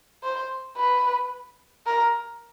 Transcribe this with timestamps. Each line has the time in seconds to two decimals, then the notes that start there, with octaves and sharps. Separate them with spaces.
0.23 C5
0.77 B4
1.86 A#4